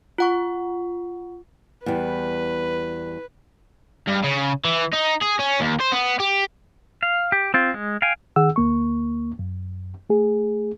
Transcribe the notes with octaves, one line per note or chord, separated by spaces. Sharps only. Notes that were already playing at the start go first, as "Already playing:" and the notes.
F4 F#5 C#6
E2 G3 B4
G2
C#3
E3
D#4
G#4
C#4
D#2
C5
B3
G4
F5
G4
C4 F4
G#3
F5 G5 G#5
D#3 G#4 F#5 E6
D2 A#3 C#6
F#2
A3 G#4